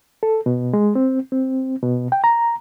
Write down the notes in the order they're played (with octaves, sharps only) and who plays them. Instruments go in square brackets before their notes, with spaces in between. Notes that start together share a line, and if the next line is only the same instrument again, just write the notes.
[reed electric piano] A4
B2
G#3
C4
C4
B2
G5
A#5